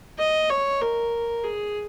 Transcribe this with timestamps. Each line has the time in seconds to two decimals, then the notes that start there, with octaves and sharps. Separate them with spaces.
0.19 D#5
0.50 C#5
0.81 A#4
1.44 G#4